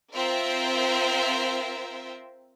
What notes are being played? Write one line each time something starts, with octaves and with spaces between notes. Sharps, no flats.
C4 F4 A#4 C5 E5